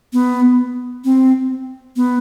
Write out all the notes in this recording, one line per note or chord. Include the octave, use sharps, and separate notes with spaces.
B3
C4
B3